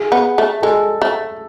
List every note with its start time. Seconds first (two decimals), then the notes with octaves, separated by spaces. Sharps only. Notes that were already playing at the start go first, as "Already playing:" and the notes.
Already playing: G#4
0.12 B3
0.38 A3
0.62 G#3 A4
1.02 A3